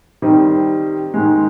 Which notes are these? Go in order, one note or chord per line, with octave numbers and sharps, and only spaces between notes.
D#3 G3 C4 D#4
G#2 D#3 G#3